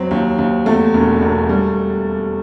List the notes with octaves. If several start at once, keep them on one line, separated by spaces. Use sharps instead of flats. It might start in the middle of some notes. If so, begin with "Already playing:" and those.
Already playing: F2 F#3 C4
D#2
D#2
E2 A3
E1
E1
G3